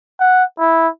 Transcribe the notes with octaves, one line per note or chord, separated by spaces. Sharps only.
F#5
E4